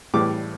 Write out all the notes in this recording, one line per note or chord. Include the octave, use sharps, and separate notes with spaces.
A2 E3 G3 D6